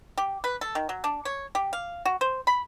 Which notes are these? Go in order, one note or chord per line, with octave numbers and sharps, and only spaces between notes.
G4
B4
A4
D#3
F#3
D4
C#5
G4
F5
F#4
C5
B5